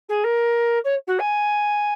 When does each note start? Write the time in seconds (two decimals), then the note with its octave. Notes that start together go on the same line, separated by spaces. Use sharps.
0.09 G#4
0.24 A#4
0.84 C#5
1.07 F#4
1.19 G#5